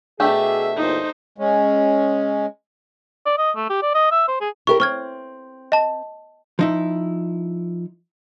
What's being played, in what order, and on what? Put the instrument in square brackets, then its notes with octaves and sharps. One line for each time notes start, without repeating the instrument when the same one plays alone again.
[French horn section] B2 G#4 [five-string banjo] A3 D4 G4 [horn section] E5
[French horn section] E2 A#2 [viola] D#4 C5
[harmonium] G#3 C#4
[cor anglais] D5
D#5
A3
G4
D5
D#5
E5
C5
G#4
[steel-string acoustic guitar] E4 G4 A#4 [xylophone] C#6
[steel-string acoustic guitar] C4 [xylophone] C#6 F6 G#6
[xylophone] D#5 A5
[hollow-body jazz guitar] F3 D#4 E4